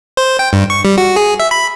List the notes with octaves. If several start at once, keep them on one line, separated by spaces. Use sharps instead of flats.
C5
G5
G2
C#6
G3
F#4
G#4
E5
B5